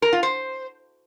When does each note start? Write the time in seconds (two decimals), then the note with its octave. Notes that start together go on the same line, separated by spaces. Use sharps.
0.02 A#4
0.13 F4
0.23 C5